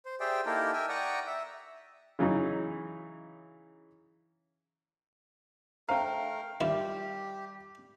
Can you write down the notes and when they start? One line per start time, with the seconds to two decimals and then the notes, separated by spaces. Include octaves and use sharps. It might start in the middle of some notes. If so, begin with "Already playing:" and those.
0.05 C5
0.20 G4 G#4 C5 D5 E5 G5
0.46 A#3 D#4 E4 G4 A4 A#4
0.73 A#4 E5 G5 G#5
0.89 D5 F#5 G5 A#5 C#6 D#6
1.27 E5
2.19 C#3 E3 F#3 D#4
5.89 A3 D4 A#4 C5 F5 G5 A#5
6.61 D#3 G3 E4 F4 G4 E5